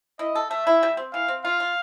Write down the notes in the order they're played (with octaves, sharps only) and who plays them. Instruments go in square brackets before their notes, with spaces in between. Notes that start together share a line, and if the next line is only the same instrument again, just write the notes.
[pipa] E4 [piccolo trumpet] D#5
[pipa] A4
[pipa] A3 [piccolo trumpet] E5
[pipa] E4
G3
C4
[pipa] E3 [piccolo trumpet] F5
[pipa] C4
[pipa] F4 [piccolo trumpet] F5
[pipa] F4